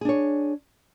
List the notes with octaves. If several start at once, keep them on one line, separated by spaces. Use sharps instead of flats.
D4 G#4 C#5